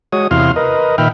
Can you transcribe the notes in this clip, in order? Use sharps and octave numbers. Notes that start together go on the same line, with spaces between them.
G#3 F#4 C#5 D#6
E2 C3 E4 F5 C6 F6
A#4 B4 D#5
A#2 D#3 E5 G5 B5 F6